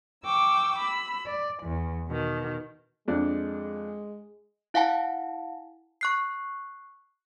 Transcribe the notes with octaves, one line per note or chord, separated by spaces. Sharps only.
G5 C#6 D6 E6
B5 E6
D5
E2
B2 D#3
F2 G#3 D4
E4 F5 F#5 G#5 A5
C#6 F#6 C7